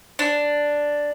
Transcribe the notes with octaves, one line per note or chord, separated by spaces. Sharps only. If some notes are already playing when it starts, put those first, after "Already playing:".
D4